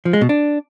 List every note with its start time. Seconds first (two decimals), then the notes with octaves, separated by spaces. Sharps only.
0.05 F3
0.13 G#3
0.21 B2
0.29 D4